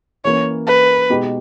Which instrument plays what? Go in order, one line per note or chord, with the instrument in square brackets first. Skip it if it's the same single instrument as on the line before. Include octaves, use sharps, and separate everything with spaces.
[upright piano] E3 A#3 C#4 [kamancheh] C#5
[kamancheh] B4
[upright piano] B2 G#3 D#4 G4